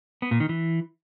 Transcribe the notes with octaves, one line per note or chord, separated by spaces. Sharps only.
B3
A#2
D#3
E3